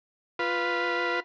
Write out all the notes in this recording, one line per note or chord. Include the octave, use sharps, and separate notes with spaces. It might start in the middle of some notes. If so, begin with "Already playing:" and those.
F4 B4